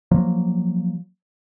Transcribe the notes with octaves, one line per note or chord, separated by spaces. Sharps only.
F3 F#3 A#3